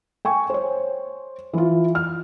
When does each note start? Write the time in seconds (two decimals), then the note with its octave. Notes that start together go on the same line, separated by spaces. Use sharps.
0.25 G5 G#5 C#6
0.50 C5 C#5
1.53 E3 F4
1.95 F6